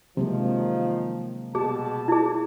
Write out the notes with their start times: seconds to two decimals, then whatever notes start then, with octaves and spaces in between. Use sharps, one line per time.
0.17 C3 D#3 F3 F#3 G#3 A#3
1.55 B2 G4 G#4 A5
2.08 E4 G#4